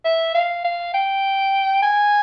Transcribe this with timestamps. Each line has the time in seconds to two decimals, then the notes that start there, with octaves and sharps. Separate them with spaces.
0.05 E5
0.35 F5
0.64 F5
0.94 G5
1.83 G#5